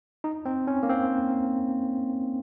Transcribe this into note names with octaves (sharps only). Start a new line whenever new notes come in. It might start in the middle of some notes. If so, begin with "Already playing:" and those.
D#4
C4
C#4
A#3
C4